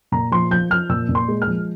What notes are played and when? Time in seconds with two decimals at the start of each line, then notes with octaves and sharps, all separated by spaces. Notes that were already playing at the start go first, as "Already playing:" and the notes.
0.12 A#2 A#5
0.32 F3 C6
0.51 F3 G6
0.70 F3 F6
0.89 A#2 E6
1.09 A#2
1.15 C6
1.28 G#3
1.42 F6
1.48 F3